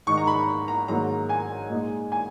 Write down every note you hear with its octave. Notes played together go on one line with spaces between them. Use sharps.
G#2 D#3 G#3 D#4 C#6
A#5
B5
A#5
G#2 D#3 F#3 A#3 A#5
G#5
A#2 G#3 D#4
G#5